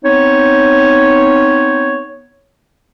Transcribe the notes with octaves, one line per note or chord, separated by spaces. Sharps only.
B3 C4 D#4 C#5